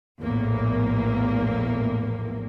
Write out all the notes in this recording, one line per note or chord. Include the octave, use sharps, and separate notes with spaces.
A#1 E2 A2 A#3